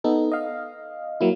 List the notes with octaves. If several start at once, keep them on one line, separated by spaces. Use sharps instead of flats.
B3 D#4 A4
D#5 F5
F#3 A#3 E4